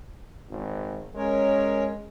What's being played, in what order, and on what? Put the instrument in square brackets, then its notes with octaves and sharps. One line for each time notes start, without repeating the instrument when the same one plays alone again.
[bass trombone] G#1
[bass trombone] G#3 [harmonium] C#4 A#4 C#5